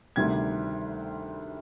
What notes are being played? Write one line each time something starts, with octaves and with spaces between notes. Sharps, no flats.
D2 C3 D#3 G3 G#6